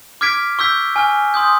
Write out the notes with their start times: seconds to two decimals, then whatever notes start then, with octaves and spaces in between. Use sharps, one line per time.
0.21 D6 F6 G#6 B6 D7
0.59 C#6 E6 G6 B6
0.96 G#5 C#6 F6
1.34 C6 D#6 G6